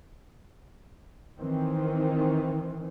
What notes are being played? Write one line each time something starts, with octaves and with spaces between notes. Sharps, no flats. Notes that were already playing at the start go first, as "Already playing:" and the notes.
D#3 E3 C4